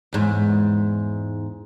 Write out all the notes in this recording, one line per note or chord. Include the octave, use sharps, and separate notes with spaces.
E2 G#2